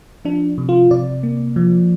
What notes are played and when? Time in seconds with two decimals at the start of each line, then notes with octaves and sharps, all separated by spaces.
0.25 F3 D4
0.58 C3
0.69 F4
0.91 C3 D5
1.23 A#3
1.56 F3